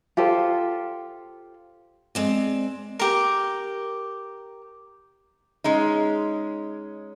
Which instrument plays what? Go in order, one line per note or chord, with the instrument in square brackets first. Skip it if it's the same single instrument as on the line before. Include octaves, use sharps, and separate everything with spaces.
[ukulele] F4 G4 A4 C5
[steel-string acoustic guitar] G#3 C4 D5
[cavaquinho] G4 A#4
[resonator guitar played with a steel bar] G#3 C#4 D#4